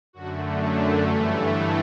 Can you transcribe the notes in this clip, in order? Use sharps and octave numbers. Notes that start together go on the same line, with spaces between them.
F#2 D3 A3 F#4
D4
G2 E3 A3 C#4
B3